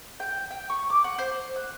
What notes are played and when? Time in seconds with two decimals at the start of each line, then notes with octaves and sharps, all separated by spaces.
0.20 G5
0.51 G5
0.70 C#6
0.90 D6
1.04 F#5
1.19 C5
1.56 F#6